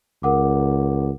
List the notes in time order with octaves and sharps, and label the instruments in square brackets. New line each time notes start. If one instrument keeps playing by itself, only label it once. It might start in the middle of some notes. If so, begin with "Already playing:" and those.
[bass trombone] C#2 [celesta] A#4 F#5 D6